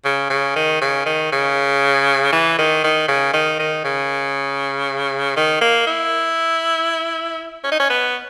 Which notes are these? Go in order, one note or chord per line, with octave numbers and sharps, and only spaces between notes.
C#3
C#3
D#3
C#3
D#3
C#3
E3
D#3
D#3
C#3
D#3
D#3
C#3
D#3
A#3
E4
C#4
D#4
C#4
B3